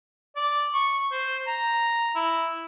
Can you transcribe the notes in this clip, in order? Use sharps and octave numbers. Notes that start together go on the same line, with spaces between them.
D5
C#6
C5
A#5
E4